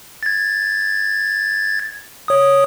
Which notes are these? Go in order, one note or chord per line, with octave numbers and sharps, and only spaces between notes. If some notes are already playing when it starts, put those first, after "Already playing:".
G#6 A6
C#5 D#6